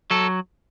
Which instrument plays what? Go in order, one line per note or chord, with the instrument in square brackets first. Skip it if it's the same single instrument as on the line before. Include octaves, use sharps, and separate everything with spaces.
[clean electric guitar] F#3 A4